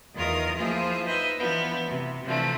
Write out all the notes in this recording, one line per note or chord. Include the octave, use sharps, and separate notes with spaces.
E2 D#3 D#4 F4 A#4 D#6
F3 A#3 E4 F4 G#4 C5
D#4 B4 C5 D#5 E5
E3 F3 B3 D4
C3
C3 E3 F3 A3 D4